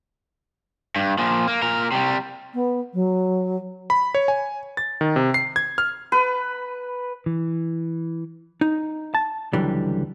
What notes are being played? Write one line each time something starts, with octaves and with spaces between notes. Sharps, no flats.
G2
A#2 F3
A#3
A#2 A#4
C3 G3
B3
F#3
B5
C#5
G#5
A6
D#3
C3
C7
G#6
F6
B4
E3
D#4
A5
C#2 D3 E3 F#3 G3